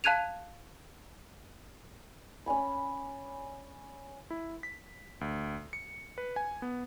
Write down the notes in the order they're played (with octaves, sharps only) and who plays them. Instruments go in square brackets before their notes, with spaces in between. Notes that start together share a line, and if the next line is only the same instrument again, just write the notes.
[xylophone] F5 A5 F#6 G#6 D#7 F7
[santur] C#4 D5 G#5 B5
[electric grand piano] E4
B6
D2
C#7
B4
G#5
B3